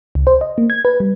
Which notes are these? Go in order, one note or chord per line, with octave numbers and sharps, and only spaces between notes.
C#2
C5
D#5
A#3
G#6
B4
G3